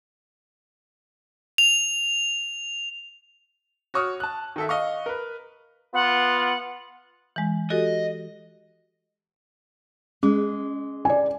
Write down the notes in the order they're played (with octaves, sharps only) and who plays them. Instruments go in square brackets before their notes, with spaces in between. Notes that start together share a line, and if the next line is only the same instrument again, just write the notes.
[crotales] F7
[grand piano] F#4 C#5 C#6 D#6 F6
A5 F#6
D#3 A4 E5
D#5 F5 C#6
A#4 B4
[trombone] B3 [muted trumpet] F4 [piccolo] F#5
[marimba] E3 G#3
[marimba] F#4 G4 A4 [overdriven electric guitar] D#5
[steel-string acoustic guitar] G#3 [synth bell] C#4
[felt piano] D5 G#5